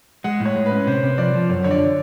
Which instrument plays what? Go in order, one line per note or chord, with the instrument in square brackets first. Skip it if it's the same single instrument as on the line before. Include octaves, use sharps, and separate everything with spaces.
[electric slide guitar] G#3 [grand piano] F#5
[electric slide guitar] A2
[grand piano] C#5
[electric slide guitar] G#3
[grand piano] B4
[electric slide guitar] C#4
[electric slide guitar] C3 [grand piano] C5
[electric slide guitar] C3
[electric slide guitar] F3 [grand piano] D5
[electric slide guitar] F3
[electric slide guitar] F#2 [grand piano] C#5
[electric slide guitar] D3 [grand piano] C#5
[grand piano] D5